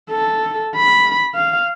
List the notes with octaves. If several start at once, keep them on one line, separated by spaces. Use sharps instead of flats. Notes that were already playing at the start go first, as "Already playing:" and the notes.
A4
B5
F5